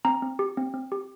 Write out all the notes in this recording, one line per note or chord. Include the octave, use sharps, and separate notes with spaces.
C4 A#5
C4
G4
C4
C4
G4